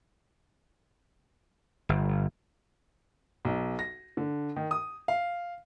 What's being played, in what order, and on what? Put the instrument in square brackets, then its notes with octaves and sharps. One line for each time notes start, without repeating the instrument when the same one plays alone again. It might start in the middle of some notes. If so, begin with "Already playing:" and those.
[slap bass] G1
[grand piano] B1
A#6
D3
D#3
D#6
F5